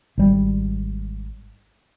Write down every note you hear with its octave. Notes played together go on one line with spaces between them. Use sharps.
G#1 G3